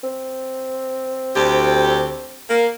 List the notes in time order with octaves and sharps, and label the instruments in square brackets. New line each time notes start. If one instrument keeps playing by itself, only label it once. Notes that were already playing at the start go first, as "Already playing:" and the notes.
[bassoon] C4
[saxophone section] D2 G4
A#3